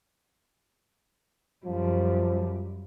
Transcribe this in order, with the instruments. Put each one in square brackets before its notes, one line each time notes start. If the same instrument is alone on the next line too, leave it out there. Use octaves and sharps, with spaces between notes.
[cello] F#2 G3 [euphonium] F3